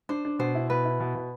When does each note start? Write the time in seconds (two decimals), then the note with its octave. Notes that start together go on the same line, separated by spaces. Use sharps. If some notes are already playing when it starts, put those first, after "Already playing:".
0.09 D4 C5
0.25 D4
0.39 B2 C5
0.55 E4
0.70 B2 B4
0.85 E4
1.00 B2
1.15 B2